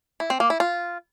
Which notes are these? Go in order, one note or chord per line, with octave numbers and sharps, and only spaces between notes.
E4
C4
A#3
E4
F4